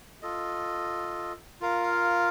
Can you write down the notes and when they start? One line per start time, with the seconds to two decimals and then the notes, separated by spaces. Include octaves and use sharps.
0.22 F4 A4 D#5
1.61 F4 A#4 F5